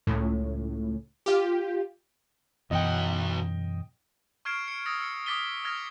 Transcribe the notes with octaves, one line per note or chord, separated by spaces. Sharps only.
C#2 A2
F4 G4
B1 F#2 B2 E3 D#5 F#5 G5
C#6 F6 G#6 C7 D7 E7
C#7 D7
D#6 E6 A6 A#6 C#7
E6 C#7
D6 D#6 A6 B6 D#7 G7
D#6 F6 G#6 A#6